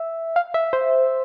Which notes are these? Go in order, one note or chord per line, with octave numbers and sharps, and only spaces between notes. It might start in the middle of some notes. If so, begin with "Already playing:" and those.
Already playing: E5
F5
E5
C5